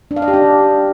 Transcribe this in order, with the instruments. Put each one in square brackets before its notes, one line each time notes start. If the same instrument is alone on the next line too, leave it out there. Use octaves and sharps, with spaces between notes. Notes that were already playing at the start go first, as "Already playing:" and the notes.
[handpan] D4
F5
D#5
G4
D4